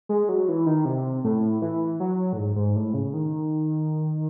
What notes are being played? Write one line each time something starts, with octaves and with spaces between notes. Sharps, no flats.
G#3
F#3
E3
D#3
C3
A2
E3
F#3
A2
G#2
G#2
A2
C#3
D#3